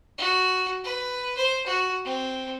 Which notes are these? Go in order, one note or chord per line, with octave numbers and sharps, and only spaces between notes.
F#4
B4
C5
F#4
C4